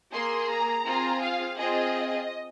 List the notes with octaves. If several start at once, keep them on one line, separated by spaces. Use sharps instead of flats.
A#3 G#4 C6
A#5
C4 F4 G#4
F5
C4 F4 G#4 D#5